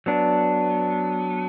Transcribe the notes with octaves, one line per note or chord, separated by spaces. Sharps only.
F#3 B3 D4